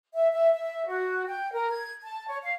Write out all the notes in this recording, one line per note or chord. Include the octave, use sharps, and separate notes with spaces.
E5
E5
E5
F#4
G5
A#4
G#6
A5
C#5
F5